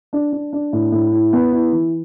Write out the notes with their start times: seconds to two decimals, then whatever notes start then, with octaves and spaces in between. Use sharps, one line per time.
0.13 D4
0.32 D4
0.53 D4
0.73 A2
0.92 A2
1.12 E4
1.33 B3
1.53 E4
1.72 E3